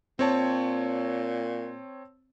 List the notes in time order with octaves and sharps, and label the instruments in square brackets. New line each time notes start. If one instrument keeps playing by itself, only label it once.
[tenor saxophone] A#2 [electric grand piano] C4 C#5 A5